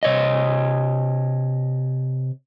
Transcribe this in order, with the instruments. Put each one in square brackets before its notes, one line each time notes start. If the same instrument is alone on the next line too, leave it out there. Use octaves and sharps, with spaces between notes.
[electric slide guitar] C3 C#5 D#5